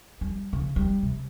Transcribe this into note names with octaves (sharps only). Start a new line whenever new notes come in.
G3
C#3
G3
C3